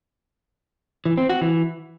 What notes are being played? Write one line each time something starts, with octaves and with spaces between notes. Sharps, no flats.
E3
C4
F#4
E3